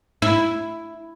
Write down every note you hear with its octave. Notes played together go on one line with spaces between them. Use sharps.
E4